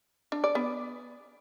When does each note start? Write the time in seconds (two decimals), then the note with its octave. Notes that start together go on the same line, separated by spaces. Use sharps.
0.32 D4
0.44 D5
0.55 B3